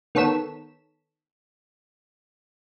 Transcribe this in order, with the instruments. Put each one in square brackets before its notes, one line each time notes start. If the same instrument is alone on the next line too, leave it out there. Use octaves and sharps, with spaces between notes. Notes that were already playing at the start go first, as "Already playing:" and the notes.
[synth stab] D#3 B3 A4 C#5 B6 E7